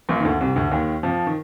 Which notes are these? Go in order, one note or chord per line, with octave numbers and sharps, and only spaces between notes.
A#1 A#2
D#3
D2 D3
C2 C3
D2 D3
D#2 D#3
F2 F3
D#3